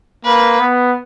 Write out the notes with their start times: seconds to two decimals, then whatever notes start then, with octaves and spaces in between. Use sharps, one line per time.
0.24 A#3 B4
0.60 B3